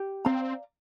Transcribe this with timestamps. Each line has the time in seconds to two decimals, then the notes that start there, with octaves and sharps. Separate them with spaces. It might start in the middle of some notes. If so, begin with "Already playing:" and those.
Already playing: G4
0.25 C4 D5 F5 A#5